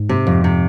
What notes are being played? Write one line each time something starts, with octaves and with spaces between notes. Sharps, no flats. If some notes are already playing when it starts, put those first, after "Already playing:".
Already playing: G#2
C3
F2
C3